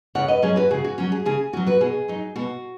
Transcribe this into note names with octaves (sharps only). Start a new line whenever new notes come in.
C#3 C#5 F#5
B4 D#5
F#3 C#4 G#4 C#5
F#4 B4
C#3 G#4
F#4
F#3 C#4 F#4
G#4
C#3 G#4
F#3 C#4 F#4
F#4 B4
B2 G#4
F#3 D#4
B2 F#4